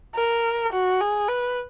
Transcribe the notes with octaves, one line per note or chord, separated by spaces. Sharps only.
A#4
F#4
G#4
B4